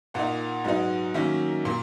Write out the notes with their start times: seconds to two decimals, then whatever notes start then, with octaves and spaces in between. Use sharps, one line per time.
0.14 A#2 A#3 D#4 F#5
0.65 G#2 F#3 B3 D#4
1.14 D#3 F#3 A#3 C#4 E5
1.65 A#2 A#3